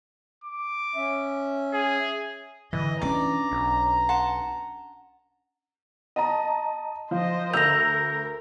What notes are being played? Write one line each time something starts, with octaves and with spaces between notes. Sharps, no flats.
D6
C#4 E5
G#4
D3 E3 D#5
C#4 D4 D5 A#5
B1
F#5 A5 C6
D#5 A5 A#5
F3 C5 D#5
D2 A#4 E6 G6 A#6 F7